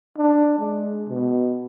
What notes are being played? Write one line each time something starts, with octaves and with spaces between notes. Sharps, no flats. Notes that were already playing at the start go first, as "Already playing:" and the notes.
D4
G#3
B2